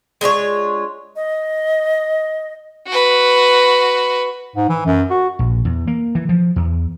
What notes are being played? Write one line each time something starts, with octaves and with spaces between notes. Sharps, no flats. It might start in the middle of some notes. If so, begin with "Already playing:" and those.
G#3 D4 F4 C#5
D#5
F#4 B4
G#2
E3
F#2
F#4
A#1
E2
A#3
E3
F3
E2